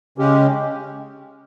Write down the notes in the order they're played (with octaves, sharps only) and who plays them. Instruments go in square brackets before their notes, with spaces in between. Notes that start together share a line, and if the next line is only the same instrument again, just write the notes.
[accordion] C#3 G#3 C#4 G4